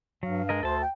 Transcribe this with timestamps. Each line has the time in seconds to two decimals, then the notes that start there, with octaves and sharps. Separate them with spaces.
0.23 G2 F#3 F5
0.49 G#3 A#4 D#5
0.63 D2 A4 C5 A5
0.81 G5